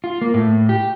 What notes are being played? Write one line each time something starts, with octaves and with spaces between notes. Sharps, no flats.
F4
A#3
A2
G4